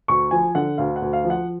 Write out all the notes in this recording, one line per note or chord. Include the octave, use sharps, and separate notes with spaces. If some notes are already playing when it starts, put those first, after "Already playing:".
D2 C#6
F3 G#5
D3 F#5
D2 F5
F#5
D2
F5
F3
F#5